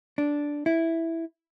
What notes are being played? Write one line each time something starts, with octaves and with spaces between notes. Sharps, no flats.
D4
E4